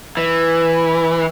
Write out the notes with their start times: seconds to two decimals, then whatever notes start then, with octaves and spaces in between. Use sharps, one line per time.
0.17 E3